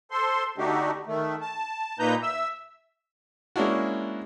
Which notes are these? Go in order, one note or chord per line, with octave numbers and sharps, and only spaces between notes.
A4 C5 C6
D3 A3 D4 D#4 F#4 G4
D#3 A3
A5
A#2 A#3 D#4 B4 A#5 G6
E5 E6
G#3 A#3 C#4 D4 E4 F#4